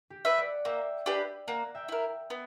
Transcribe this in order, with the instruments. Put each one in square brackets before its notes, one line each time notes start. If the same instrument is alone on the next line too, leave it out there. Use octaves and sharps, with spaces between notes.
[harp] G4
[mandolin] B4 E5
[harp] D5 F#5
[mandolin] A#3 [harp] E5 G5
[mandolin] D4 G4 B4
[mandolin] A#3 [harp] F#5 A#5
[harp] E5 G5
[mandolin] E4 A#4
B3